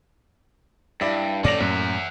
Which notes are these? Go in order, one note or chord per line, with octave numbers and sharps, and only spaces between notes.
G2 E4 D5
F#2 A#2 D#3 C#4 A4 D5 A#6 F7
F#2 A2 A#3 E5 F#5